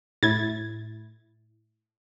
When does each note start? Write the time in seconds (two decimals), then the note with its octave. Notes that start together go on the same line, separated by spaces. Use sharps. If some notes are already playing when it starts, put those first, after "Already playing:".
0.23 A2 E4 G#6 A6